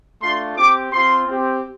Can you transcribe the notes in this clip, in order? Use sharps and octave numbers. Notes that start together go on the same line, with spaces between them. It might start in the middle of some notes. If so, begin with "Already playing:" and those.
A3 D4 F4 C6
C4 G4 D6
C4 F4 C6
C4 G4